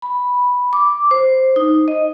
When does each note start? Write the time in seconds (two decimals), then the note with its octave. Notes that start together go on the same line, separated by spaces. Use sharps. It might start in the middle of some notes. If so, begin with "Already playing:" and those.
0.02 B5
0.73 D6
1.11 C5
1.56 D#4
1.88 D#5